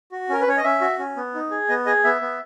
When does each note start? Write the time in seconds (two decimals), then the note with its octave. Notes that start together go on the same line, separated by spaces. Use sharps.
0.12 F#4
0.29 C#4 A#4
0.41 B4
0.47 C#4 C#5
0.57 D#5
0.64 C#4 E5
0.81 F#4
0.99 C#4
1.17 B3
1.35 D#4
1.51 G#4
1.69 B3 D#5
1.86 G#4 D#5
2.04 B3 E5
2.21 B3